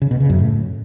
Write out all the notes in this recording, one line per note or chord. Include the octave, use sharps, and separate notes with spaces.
C#3
B2
C#3
F#2
A2